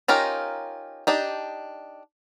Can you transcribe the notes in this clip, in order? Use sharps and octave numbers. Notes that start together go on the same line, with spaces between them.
C#4 D#4 F4 G4 A#4
D4 D#4 G4